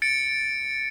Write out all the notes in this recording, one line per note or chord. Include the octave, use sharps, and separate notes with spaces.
A6 C#7 D7